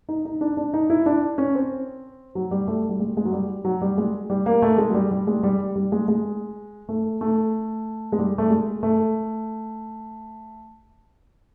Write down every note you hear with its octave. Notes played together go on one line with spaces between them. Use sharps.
D#4
D#4
D4
D4
D#4
E4
D4
C#4
C4
F#3
G3
A3
G3
G#3
G#3
F#3
G3
F#3
G3
G#3
G3
A#3
A3
G#3
F#3
G3
G3
G#3
G3
G3
G#3
G#3
A3
A3
G#3
G3
A3
G#3
A3